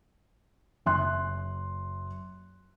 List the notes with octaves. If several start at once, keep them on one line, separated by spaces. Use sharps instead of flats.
F#1 E5 C6 F#6